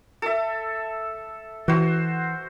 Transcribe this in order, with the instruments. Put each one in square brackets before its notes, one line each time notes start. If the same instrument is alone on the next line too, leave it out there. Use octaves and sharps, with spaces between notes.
[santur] A4 E5
[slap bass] E3 [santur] F#4 C5